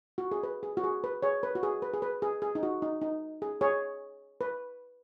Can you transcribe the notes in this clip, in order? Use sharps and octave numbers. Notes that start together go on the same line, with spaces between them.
F#4
G#4
B4
G#4
F#4
G#4
B4
G#4 C#5
B4
F#4
G#4
B4
G#4
B4
G#4
G#4
D#4
F#4
D#4
D#4
G#4
G#4 C#5
B4